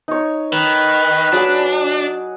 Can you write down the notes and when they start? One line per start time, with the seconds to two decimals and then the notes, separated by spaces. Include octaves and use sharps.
0.08 D#4 C#5
0.53 D#3 B4
1.32 F#3 D4 G#4 F#5